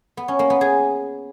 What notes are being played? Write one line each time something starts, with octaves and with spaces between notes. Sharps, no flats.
B3
C#4
A#3
B3
G#4